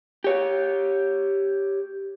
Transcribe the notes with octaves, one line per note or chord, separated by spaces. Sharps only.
G4 C#5